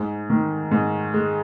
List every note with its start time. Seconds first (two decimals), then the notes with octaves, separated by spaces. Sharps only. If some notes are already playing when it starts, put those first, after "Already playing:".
Already playing: G#2
0.30 D#3
0.71 G#2
1.14 G#3